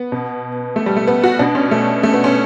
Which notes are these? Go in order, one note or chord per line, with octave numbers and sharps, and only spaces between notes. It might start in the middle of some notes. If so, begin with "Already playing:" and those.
Already playing: B3
B2
A3
G3
A3
B3
F#4
B2 D4
C#4
A3
A3
B3
C#4